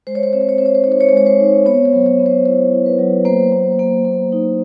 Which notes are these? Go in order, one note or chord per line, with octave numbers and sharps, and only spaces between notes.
G#3 C5
C#5
C5
C4 C#5
C5
C#5
C4 C5
C#5
C5
D#4 C#5
C5
C#5
C5
G#3 C#5
C5
D#4
B3 C#5
C5
F#3
C#5
B3
C5
E4 C5
E4
B4
F#3
A#3 C5
A#3
A#3
A#3
D#4